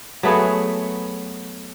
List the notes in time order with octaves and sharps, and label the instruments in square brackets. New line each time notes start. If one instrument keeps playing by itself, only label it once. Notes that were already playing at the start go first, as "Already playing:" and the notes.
[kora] F#3 A3 B3 G#4